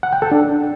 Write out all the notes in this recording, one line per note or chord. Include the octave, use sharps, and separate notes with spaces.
F#5
G5
A4
D4